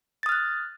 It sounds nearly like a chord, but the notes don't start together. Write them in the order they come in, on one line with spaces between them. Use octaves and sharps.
A6 D#6 F6 F#6